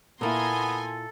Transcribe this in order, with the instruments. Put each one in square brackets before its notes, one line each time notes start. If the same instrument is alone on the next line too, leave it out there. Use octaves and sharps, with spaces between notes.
[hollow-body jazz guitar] A#2 A#3 E4 [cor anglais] B3 [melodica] A4 [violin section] G#5 A#5 C6